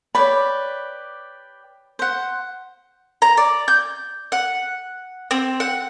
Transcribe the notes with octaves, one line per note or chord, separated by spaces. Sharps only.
G4 B4 C#5 D5 B5
C5 F#5
A#5
D5
G6
F#5
C4
F#5